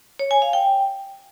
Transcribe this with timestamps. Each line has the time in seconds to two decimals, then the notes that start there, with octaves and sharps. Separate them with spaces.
0.19 C#5
0.31 G#5
0.42 F5
0.53 G5